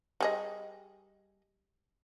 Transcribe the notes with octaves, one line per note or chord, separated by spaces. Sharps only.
G3 G#4 D#5